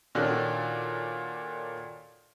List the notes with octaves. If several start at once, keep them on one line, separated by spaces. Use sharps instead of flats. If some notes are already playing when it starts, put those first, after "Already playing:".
A#2 D#3 C#4 D4 F#4 A4